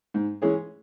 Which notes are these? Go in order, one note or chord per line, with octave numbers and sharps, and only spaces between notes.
G#2
E3 G#3 C#4 G#4